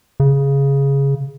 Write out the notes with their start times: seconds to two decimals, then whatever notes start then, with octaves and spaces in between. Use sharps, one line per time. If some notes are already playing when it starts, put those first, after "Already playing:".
0.20 C#3